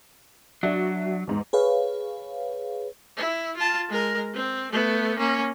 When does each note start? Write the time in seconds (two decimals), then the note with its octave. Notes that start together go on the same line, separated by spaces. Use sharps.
0.63 F#3 D4 F#4 E5
1.27 E2 G#2
1.53 G#4 B4 C#5 F5
3.17 E4
3.57 F4 A5
3.89 G#3 A#4
4.34 C4
4.71 A3 B3
5.18 A#3 C#4